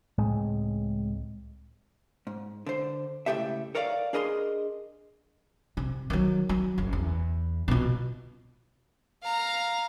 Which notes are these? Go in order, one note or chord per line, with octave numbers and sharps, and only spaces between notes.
C#2 A2 G#3 C4
G#2
D3 C5
C#2 A2 G4 A4 E5
A4 A#4 C#5 D5 F5
D4 G#4 A#4 D#5 A#5 C6
C3
D#3 F#3
F#3
F#1 F#2
E2
B2 F4
F5 A#5